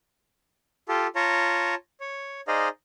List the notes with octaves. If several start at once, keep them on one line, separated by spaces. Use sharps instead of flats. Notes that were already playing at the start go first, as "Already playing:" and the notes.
F4 G4 A4
F4 C#5 A5 A#5
C#5
D#4 G#4 C5 D5 D#5 F5